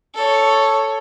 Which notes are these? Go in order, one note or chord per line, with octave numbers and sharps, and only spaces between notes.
A4 C#5